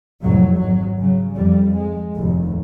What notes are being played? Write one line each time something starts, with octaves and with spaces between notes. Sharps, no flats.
C2 F2 A2 F#3
G#1 A2 F#3
C#3 F#3
F2 G3
G#3
F1 D#2 A2